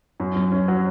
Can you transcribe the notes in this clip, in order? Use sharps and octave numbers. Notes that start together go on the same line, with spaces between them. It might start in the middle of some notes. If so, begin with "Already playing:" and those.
F#2
F#2
C#4
F#3